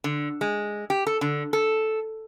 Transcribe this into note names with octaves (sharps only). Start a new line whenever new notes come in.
D3
G#3
G4
A4
D3
A4